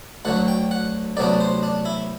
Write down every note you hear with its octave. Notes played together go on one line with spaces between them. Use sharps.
D2 D3 F#3 F#5
G5
F#5
D2 C3 F#3 B3 D4 D5
C5
D4
E4